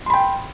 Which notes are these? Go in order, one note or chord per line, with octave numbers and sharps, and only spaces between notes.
G5 B5 C6